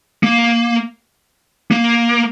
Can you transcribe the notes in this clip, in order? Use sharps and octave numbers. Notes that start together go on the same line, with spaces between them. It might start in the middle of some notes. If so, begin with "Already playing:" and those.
A#3
A#3